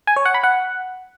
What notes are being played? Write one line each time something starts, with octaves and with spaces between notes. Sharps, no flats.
G#5
C#5
F#5
B5
F#5